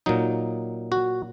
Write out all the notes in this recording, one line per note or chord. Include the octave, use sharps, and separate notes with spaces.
A#2 F#3 D#4
F#4